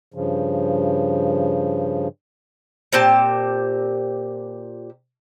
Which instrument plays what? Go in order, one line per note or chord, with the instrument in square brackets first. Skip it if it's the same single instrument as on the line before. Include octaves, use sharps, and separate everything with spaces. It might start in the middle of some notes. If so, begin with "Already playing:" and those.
[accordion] G2 C#3 F3
[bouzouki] A#2 C4 G4 A5